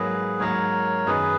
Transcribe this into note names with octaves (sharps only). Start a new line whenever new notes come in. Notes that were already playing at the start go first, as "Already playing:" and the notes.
Already playing: G#2 F#3 A#3 G#4 B4
G#2 F#3 A#3 A#4 C#5
F#2 D#3 F#3 B3 D#4 G#4 B4